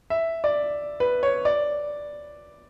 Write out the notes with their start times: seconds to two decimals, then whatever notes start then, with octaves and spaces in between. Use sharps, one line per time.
0.10 E5
0.44 D5
1.00 B4
1.23 C#5
1.45 D5